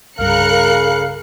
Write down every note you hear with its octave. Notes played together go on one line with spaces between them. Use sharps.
C2 G2 C#3 A#4 F5 F#6 C#7